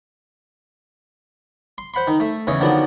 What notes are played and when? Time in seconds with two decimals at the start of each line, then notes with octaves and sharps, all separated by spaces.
1.78 C6
1.94 C5 F#5 B5 C6
2.07 D#3 D#4
2.20 A3 E5
2.47 E2 C#3 E3 C#5 D#5
2.60 D3 D#3 F3 F#3 B3 D4